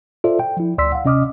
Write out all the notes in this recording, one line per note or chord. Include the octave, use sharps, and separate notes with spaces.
F4 A4 C5 D5 E5
G5
F3 E4
D2 D5 C6 E6 B6
F5 F#5
C3 C#4 D#5 D6 D#6 F6